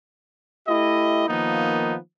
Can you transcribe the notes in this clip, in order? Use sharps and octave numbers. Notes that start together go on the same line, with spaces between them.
A3 E4 G4 D#5
D#3 F3 A#3 B3 D#4